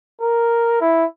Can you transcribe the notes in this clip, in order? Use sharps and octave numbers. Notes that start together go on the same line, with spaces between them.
A#4
E4